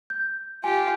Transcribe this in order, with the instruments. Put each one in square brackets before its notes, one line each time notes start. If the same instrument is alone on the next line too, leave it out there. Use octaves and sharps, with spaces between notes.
[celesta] G6
[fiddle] F4 G4 [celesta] G#5